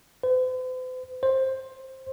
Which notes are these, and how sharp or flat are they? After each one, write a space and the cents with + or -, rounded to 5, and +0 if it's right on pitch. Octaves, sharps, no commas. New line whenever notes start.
C5 -45
C5 +15